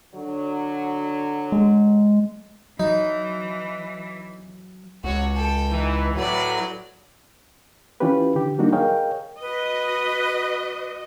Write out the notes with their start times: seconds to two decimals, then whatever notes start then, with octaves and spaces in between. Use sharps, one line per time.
0.15 D3 F#3
1.52 G#3
2.80 E3 F#3 D#4
5.04 C#2 F#4 C#5
5.35 A4 G5
5.72 E3 D#4
6.15 A2 F#3 B4 D5
8.00 E3 C#4 E4 F4 G4 B4
8.35 D3 G4
8.58 F#3 G3 A#3 D4 D#4 F#4
8.72 G#4 A#4 C#5 D#5 F5 G5
9.41 F#4 B4 D#5